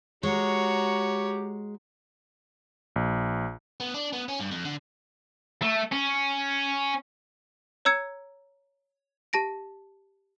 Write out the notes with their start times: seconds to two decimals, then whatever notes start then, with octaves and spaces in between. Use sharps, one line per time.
0.23 G#3 F#4 G4 C#5 A#5
2.96 A#1
3.80 B3
3.94 D4
4.13 B3
4.29 C#4
4.40 G2
4.51 F2
4.65 D3
5.62 A3
5.92 C#4
7.85 C#5 A#5 E6 G#6 C#7
9.33 G4 A5 A#6 D7